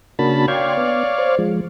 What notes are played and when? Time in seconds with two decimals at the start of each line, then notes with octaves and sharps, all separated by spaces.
0.19 C#3 A#3 D4 F#4 A5 B5
0.48 C#5 D5 F5 G5 C6 G#6
0.77 B3
1.18 C5
1.39 F3 G#3